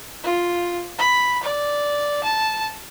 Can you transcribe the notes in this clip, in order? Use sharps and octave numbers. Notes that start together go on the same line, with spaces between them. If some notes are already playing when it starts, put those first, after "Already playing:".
F4
B5
D5
A5